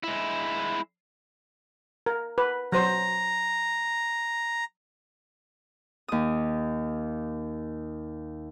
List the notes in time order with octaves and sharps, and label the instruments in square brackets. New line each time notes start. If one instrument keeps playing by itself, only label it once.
[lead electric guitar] G#3 E4
[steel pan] A#4
B4
[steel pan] F#3 C5 [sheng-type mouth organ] A#5
[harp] D#2 D#6